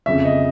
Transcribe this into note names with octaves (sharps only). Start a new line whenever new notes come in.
G1 F2 C#3 E5
D#5